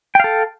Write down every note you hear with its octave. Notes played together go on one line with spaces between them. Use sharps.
A4 F5 G5